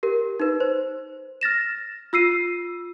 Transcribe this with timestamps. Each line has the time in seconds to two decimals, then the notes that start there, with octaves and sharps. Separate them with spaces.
0.03 G4 A#4
0.40 D#4 B4
0.60 C5
1.41 F6 A6 A#6 E7
2.13 F4 E6 C7 D#7